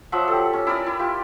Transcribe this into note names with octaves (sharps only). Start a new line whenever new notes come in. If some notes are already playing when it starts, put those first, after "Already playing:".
F3 F#3 E5 F#5
G4 A4
C#4
E4 A#4 D5 D#6
E4
F4 G4